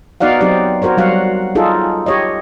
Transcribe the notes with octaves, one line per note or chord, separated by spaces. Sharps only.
B3 D#4 F#4 D5 F5 F#5
F#3 C4 D#4 G4 D5
F#4 A#4 C5 C#5
F#3 G3 F#4 F5 F#5
D#4 F4 G#4 A4
G4 C#5 D#5